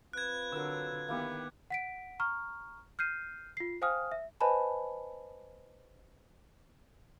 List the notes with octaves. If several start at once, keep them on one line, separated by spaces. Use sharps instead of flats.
C4 F4 B4 F#6 G#6
D3 F#3 A#4 E6
D#3 A#3 B3 E4 G4
F#5 B6 D7
A#5 C#6 F6
F6 G6 C7 D#7
F4 C7
C5 F5 G5 G#5 D#6 F6
E5
B4 C5 D#5 G#5 A5 B5